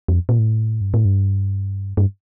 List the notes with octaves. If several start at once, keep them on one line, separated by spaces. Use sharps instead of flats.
F2
A#2
A2
G2
A2
G2
G2